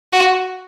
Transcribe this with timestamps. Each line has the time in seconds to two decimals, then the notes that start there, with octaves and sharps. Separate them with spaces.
0.13 F#4